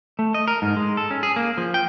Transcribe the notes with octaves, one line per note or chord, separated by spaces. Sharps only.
A3
D#5
A#4
G#2
G#3
A4
C#4
G#4
A#3
F3
G5